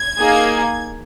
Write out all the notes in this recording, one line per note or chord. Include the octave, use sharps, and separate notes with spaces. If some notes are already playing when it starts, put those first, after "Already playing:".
Already playing: G#6
A#3 D#4 G#4